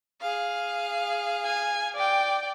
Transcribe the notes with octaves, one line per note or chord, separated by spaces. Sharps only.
G#4 F5
G#5
D5 G5